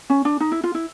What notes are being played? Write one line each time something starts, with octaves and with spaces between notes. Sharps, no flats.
C#4
D4
D#4
E4
F4
E4